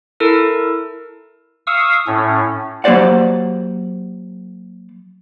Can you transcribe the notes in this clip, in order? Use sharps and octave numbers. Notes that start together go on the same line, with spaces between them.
E4 A4 A#4
F5 C#6 D#6 E6
A2 C#4
F#3 A#3 G4 C5 D5 F#5